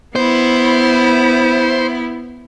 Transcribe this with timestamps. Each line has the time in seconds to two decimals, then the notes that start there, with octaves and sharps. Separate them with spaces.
0.16 B3 E4 C5